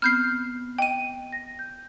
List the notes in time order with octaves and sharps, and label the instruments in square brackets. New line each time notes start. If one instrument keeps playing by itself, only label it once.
[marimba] B3 C4 B5 [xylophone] F6 G6 C7
[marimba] D#5 [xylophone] G5 D#7
[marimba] A#6
G6